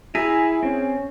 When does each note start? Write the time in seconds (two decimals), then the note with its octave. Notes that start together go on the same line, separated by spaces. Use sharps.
0.15 E4 G#4 E5 G#5 A#5
0.63 C4 C#4